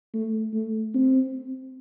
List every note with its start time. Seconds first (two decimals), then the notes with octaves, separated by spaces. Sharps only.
0.14 A3
0.54 A3
0.94 C4